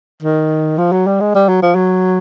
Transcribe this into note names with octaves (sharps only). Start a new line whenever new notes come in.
D#3
F3
F#3
G3
G#3
G3
F#3
F3
F#3